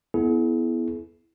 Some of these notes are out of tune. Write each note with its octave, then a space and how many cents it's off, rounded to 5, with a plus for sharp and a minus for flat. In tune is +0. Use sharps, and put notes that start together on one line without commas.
B3 +0 E4 -5 G#4 +35